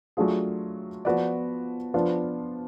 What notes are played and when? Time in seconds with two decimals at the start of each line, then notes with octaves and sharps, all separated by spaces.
0.17 F#3 A3 D4 F4 G#4
1.05 F3 B3 F#4 B4 D5
1.94 F3 B3 D4 F4